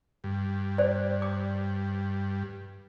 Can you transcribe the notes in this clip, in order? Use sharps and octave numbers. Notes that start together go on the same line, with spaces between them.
G2
C5 D5
D6